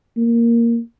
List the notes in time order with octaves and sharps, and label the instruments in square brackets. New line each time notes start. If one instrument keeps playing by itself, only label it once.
[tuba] A#3